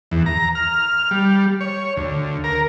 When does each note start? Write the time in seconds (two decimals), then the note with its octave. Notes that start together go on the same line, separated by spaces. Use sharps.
0.11 E2
0.26 A#5
0.55 F6
1.11 G3
1.61 C#5
1.97 D2
2.44 A#4